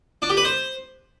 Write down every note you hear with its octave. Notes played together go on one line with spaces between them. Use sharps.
D4
G4
B4
C5